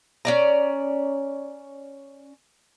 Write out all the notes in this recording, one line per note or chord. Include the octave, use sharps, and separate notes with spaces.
C#4 D5 A#5